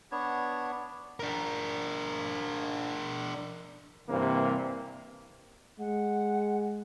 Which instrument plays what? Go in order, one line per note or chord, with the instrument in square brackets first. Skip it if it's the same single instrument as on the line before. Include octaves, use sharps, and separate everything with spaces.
[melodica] B3 D4 C#5
[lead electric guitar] D4 A#4
[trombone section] G2 C3 E3 A#3
[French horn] G#3 [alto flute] F#5